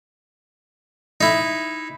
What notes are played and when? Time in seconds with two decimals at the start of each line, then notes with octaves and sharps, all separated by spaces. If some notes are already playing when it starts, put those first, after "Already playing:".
1.21 D#4 E4